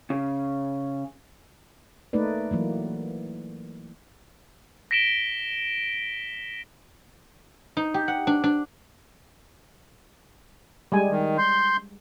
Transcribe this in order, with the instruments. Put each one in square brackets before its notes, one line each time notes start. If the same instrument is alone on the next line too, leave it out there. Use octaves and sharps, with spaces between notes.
[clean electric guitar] C#3
[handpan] A3 A#3 D#4 B4 D5
E3 F#3 A#3
[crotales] A#6 B6 D7 E7 G7
[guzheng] D#4
G4
F#5
D4
D4
[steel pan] G3 G#3 G#5
[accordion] D#3
C6 G6